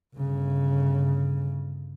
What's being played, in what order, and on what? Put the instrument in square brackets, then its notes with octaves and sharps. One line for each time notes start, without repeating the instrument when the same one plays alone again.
[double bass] G1 C#3